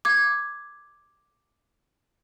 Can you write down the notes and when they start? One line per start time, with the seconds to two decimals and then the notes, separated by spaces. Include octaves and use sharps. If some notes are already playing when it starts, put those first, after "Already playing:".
0.05 D6 G#6